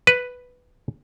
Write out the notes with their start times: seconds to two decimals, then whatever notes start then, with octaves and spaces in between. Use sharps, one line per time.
0.07 B4